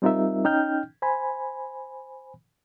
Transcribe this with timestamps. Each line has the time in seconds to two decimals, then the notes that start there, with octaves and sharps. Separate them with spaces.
0.02 G3 C4 D#4 F4 A#4 E5
0.44 C#4 D#4 G5 F6 G6
1.02 C5 G#5 B5